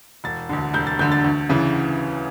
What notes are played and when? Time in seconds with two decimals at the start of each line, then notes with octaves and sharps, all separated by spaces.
0.24 E1 A6
0.49 D2 D3
0.74 E1 G6
0.87 A6
0.99 D2 D3 G6
1.12 A6
1.24 D2
1.50 C#3 E3